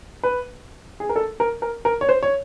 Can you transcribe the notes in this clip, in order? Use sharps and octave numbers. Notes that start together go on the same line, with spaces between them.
B4
G#4
A#4
A4
A#4
A#4
A#4
C#5
C5
C#5